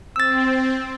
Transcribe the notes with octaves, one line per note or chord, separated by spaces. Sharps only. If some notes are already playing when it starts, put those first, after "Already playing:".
C4 E6 A6